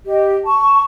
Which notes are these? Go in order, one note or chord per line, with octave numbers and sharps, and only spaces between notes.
G4 D#5
A5 C#6